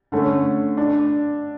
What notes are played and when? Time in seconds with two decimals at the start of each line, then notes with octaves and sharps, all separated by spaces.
0.12 D3 A3 C#4
0.77 D4